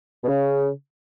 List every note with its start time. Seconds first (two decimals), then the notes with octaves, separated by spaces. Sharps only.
0.24 B2
0.28 C#3